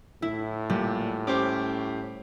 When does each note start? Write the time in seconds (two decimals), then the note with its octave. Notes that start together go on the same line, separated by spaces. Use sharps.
0.22 A2 E4
0.70 A#2 G3
1.27 C#4 G4 C5 D6